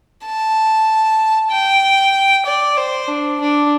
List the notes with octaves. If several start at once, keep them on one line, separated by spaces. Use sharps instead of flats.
A5
G5
D5
C5
D4
D4